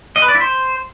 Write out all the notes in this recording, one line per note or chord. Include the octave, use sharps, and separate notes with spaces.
D#5
B4
D5
E4
C5